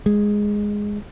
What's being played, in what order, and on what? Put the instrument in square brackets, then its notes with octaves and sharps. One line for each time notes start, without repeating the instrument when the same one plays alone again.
[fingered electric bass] G#3